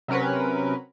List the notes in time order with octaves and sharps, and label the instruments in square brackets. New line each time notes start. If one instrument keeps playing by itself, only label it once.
[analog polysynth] C3 F#3 C#4 A#4 B4